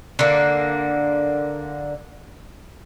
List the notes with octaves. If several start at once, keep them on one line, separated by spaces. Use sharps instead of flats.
D3 A#3